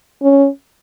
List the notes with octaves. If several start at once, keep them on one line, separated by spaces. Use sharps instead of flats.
C#4